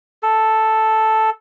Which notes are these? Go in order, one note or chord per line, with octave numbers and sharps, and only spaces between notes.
A4